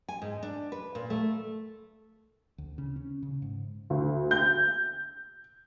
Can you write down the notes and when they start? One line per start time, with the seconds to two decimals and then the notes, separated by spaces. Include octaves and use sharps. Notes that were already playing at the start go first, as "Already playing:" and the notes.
0.08 G#5
0.22 G#2
0.43 D4
0.72 B4
0.95 A#2
1.10 A3
2.58 D2
2.78 C#3
2.96 C#4
3.23 C#3
3.42 G#2
3.90 D2
4.31 G6